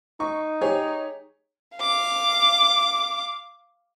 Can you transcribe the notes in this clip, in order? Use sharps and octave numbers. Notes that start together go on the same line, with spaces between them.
D#4 C#6
G4 G#4 C#5
F5 D6